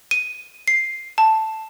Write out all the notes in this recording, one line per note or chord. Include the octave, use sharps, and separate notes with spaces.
D#7
C7
A5